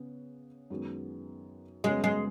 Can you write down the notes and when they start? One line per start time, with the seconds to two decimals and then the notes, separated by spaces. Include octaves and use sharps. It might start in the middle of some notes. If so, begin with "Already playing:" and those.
Already playing: C#3 B3
0.70 F#2 D#3 G#3 B3 F#4
1.84 F#2 C#3 G#3 B3 G#4 C#5
2.04 G#3